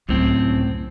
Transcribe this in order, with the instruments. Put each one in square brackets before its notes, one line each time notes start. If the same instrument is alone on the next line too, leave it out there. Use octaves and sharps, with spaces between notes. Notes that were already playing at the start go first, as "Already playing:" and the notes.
[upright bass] C#2 [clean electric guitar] F#2 A2 C4